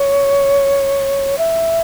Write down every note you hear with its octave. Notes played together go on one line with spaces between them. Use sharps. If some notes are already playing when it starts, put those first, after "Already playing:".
Already playing: C#5
E5